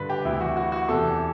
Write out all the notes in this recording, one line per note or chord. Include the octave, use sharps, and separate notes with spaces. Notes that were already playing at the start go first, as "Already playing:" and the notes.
Already playing: G2 D3 B4
G4
D2 C3 E3 E4
F#4
F#4
F#4
E2 C3 E3 A4